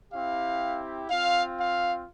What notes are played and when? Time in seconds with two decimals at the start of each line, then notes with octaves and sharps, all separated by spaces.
0.11 C4 E4 G4 F5
1.09 C4 F4 F5
1.59 F5